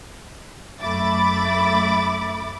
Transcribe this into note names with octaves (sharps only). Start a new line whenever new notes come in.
F#2 A3 E5 B5 D6 A6